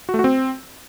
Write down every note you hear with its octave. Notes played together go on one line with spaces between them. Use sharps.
F#4
A3
F#4
C4